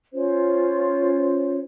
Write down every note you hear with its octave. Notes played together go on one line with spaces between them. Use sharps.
C#4 F4 C5 C#5